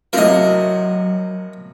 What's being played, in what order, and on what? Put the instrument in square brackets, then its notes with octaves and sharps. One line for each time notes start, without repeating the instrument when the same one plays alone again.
[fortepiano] A2 C3 A#3 [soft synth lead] F#3 [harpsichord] A#4 D#5